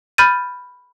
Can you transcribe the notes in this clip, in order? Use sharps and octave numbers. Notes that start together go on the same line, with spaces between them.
B5 F6 G6 A6 D#7